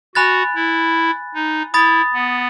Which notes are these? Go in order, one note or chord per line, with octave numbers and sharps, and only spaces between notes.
F#4 G#5 B5 F#6 A6
E4
D#4
E4 B5 D#6 A6
B3